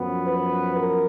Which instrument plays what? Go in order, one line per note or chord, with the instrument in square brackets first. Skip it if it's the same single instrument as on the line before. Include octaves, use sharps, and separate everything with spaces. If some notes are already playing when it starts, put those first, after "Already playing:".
Already playing: [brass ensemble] F#2 F3 B3
B4
A#4